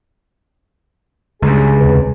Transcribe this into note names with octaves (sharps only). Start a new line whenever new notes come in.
C#2 G2 G#4
D#2 C3 B4